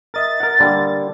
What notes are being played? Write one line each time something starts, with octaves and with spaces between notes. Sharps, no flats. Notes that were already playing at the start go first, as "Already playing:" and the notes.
A#4 D#5 E5 A6
A#4 F#5
D3 G3 A#3